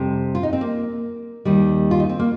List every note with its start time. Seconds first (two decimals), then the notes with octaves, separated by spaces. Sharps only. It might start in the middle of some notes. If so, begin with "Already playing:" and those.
Already playing: F2 C3 G3 C4
0.35 F4
0.43 D#4
0.53 C4
0.61 A#3
1.45 D#2 D#3 G3
1.91 F4
2.00 D#4
2.09 C4
2.19 A#3